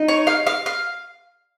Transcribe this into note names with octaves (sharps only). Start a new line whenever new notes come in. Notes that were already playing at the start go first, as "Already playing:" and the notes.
Already playing: D#4
C#5
F5
F5
F5